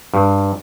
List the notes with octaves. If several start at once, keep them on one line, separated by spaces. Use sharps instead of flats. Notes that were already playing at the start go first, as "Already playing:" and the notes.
G2